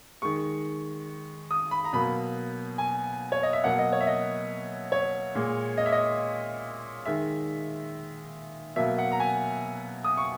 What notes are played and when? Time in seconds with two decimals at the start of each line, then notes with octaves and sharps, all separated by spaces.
0.22 D#3 G#3 C#6
1.51 D#6
1.71 B5
1.84 A#5
1.93 B2 F#3 A#3 B5
2.78 G#5
3.32 C#5
3.43 D#5
3.53 E5
3.64 B2 F#3 A#3 F#5
3.79 D#5
3.92 C#5
4.01 E5
4.07 D#5
4.92 C#5
5.35 A#2 G#3
5.78 D#5
5.86 E5
5.92 D#5
7.05 D#3 G#3 E5
8.76 B2 F#3 A#3 E5
8.98 F#5
9.12 A#5
9.20 G#5
10.04 D#6
10.17 C#6